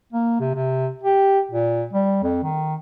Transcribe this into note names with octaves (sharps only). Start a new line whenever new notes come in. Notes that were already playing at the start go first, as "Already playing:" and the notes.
A#3
C3
C3
G4
A#2
G3
F2
D#3